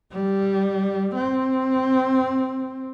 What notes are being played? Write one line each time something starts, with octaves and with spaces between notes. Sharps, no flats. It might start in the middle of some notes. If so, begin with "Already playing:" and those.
G3
C4